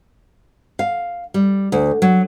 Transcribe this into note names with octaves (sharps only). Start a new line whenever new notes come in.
F5
G3
D2
F#3